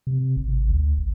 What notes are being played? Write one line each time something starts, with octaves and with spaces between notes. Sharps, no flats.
C3
G#1
D2
G#1